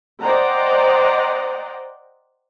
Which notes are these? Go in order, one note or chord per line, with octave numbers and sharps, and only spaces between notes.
C5 D5 D#5 F#5 G5 A#5